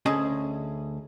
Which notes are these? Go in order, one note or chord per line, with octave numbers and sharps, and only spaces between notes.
D2 C#4 G#4 D#5 A5